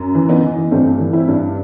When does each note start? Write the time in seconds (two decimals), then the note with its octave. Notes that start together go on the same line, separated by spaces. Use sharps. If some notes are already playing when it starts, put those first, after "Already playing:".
Already playing: F#2
0.15 E3
0.29 B3 D#4
0.43 E3
0.71 G2 A3 C4
0.99 E3
1.13 C4 E4
1.28 G2